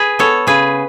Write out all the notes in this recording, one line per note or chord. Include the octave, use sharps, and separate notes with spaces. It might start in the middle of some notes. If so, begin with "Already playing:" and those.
Already playing: G#4 B4
B3 A4 C#5
C#3 G#4 B4